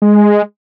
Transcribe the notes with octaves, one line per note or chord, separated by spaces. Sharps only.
G#3